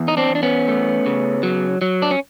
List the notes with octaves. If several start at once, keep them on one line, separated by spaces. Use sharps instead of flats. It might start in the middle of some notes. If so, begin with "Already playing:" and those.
Already playing: E2
D#4
C4 D4
E2
D4
B3 C#4
A3
C#3
F#3
F#3
D4
C#4